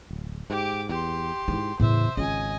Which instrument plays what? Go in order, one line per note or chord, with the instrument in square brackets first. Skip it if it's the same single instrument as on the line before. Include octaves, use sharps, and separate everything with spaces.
[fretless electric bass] D1
[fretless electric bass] G#2 [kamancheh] G4 D6
[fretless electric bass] E2 [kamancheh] G4 C6
[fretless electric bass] G#2 [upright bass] D#4 E4
[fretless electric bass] E2 [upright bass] A2 C#3 [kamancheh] C5 E5
[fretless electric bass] G#1 C#3 [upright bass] C#4 F4 [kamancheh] D#5 G#5